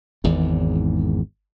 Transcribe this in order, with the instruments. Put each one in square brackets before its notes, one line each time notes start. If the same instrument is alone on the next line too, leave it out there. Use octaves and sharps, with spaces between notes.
[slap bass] G#1 E2 G#2